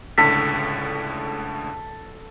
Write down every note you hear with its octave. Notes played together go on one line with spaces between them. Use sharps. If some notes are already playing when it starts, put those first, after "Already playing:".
C#2 A2 D3 A4 B6